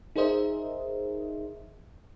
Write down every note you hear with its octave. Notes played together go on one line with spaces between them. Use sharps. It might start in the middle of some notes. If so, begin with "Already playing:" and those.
D#4 G#4 A#4 C5 D#5 E5